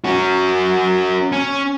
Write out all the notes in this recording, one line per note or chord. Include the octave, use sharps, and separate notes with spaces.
C#4 F#4
C#4